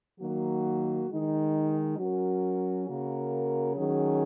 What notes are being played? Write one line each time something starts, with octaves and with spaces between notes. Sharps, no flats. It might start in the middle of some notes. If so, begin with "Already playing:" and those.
D#3 F#3 A#3 F#4
D#3 G#3 D#4
F#3 C#4 F#4 A#4
C#3 A#3 F#4 A#4
D#3 F#3 C#4 G#4